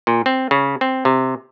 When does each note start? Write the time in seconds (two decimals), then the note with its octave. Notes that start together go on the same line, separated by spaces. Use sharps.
0.07 A#2
0.26 C4
0.51 C#3
0.81 C4
1.05 C3